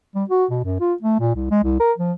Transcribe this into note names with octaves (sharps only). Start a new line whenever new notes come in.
G3
F#4
B2
F#2
F4
A3
A#2
C2
G#3
C2
A#4
F3